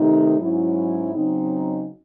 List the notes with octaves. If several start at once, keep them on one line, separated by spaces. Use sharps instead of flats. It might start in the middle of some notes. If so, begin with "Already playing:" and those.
Already playing: C3 D#3 A3 D#4
G#2 F#3 C#4 E4
C#3 F#3 C4 D#4